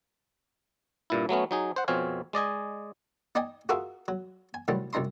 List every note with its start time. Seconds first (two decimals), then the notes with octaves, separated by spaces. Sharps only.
1.10 G2 A#2 E4
1.29 F#3 A3 B3 C#4
1.51 F#3 D#4 G#4
1.76 C5 F#5
1.88 F2 B2 C4 C#5 F5 G#5
2.33 G#3 D5 D#5 G#5
3.35 D#4 D5 D#5 G5 G#5
3.69 F4 F#4 G#4 A#4 E5 F5
4.08 F#3
4.54 G#5
4.68 A2 C3 D#3 F#3 G3
4.93 C2 F#2 D#4 A#5 C6